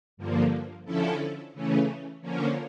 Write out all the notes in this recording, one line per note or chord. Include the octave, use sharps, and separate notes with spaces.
G2 D3 F3 A#3
D3 F3 C#4 E4 A4
C#3 E3 A3 C#4
D3 F3 A#3 C#4